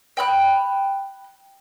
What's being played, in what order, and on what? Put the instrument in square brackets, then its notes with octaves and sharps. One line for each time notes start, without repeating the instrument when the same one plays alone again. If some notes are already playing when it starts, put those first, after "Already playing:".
[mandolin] G5 B5 F#6